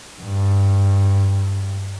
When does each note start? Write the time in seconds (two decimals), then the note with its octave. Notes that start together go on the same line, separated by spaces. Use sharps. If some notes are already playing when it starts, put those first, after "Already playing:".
0.22 G2